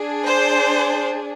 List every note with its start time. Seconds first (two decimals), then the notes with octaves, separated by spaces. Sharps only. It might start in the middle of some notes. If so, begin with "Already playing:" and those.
Already playing: D4 G#4
0.27 C5